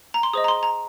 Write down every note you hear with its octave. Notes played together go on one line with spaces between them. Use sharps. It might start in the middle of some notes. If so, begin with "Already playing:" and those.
A#5
C6
G#4 C5 D#5 D#6
A#5
C6
A#5